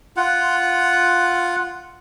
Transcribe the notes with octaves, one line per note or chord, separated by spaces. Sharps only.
F4 F#5